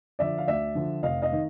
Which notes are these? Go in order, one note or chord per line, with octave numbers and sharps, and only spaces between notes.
D3 F3 D5 E5
F5
D2 D5 E5
D3 F3
F1 D#5 F5
D#5 F5
D#3